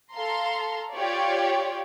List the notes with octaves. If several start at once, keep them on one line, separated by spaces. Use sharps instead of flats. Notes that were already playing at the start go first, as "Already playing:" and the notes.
A4 F5 A#5 C6
F4 G4 C#5 D5